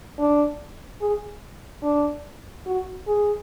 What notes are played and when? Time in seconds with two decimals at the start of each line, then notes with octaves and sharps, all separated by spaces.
0.19 D4
1.01 G#4
1.83 D4
2.66 F#4
3.07 G#4